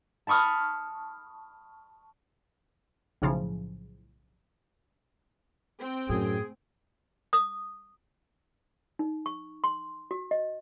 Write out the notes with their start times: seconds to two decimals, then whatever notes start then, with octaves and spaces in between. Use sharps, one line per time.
0.27 A5 B5 C#6 D#6 F6
3.22 B1 A2 C#3 F3
5.79 C4 G5
6.09 F#2 A2 G#4
7.33 D#6
8.99 D#4
9.26 C#6
9.64 C6
10.11 F#4
10.31 D#5